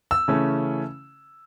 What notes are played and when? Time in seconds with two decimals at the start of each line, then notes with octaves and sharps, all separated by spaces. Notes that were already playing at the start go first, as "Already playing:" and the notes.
0.11 E6
0.28 C#3 E3 A3 C#4